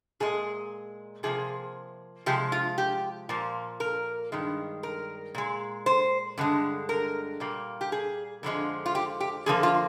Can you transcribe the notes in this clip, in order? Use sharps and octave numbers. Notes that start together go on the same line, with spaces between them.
A#2 G#3 G#4
C3 F3 A#3 G#4
C3 F3 G#3 G4
F4
G4
A#2 F3 A#3
A#4
G2 D#3 G#3
A#4
A#2 G#3
C5
G2 D3 G#3
A#4
A#2 G3 A#3
G4
G#4
F2 D3 F3 G#3
F4
G4
G4
F2 D3 F3 A#3 G#4
F4